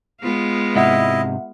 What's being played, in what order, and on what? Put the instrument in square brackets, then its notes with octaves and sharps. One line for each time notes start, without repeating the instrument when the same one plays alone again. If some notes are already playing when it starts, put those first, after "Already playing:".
[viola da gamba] G#3 B3 F4
[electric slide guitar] G#2 C3 [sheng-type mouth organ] E4 D#5 [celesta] E5 F#5